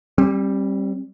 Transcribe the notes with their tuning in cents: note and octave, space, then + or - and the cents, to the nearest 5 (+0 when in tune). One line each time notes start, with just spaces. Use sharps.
G3 +0 C4 +40